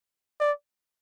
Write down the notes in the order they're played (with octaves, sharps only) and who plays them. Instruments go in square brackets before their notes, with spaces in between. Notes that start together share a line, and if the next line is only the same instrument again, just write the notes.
[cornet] D5